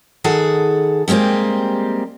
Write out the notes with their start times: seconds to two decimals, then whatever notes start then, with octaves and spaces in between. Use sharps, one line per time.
0.24 D#3 G#4 A4 F#5
1.08 G3 G#3 A#3 C4 G4